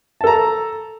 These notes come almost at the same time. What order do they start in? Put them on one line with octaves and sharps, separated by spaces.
A5 A4 A#5